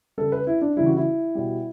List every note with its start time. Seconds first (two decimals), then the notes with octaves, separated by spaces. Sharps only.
0.18 C#3 G3 A4
0.32 B4
0.47 E4
0.61 D4
0.76 C#3 E3 G3 E4
0.86 F#4
0.97 E4
1.35 B2 G3